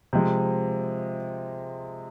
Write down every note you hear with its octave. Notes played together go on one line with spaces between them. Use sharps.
C3 F3 G#3